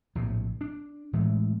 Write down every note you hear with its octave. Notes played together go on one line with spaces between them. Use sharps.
A#1 A2 C3
D4
A2 E3 G#3 A3